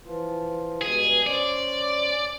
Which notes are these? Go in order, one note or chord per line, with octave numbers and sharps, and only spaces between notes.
E3 F3 F4
G2 B2 G#3 G#4
C#4 C5 D5